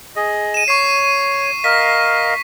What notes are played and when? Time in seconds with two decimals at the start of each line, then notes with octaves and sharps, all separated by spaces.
0.16 G#4 D#5
0.54 D#7 E7
0.68 C#5 C#6 C7
1.64 A#4 D#5 F5 B6